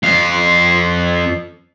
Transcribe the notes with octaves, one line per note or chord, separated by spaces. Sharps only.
F2 F5